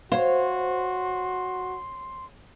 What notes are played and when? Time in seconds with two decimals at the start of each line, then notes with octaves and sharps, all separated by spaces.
0.12 F#4 C5 C#5 F5 C6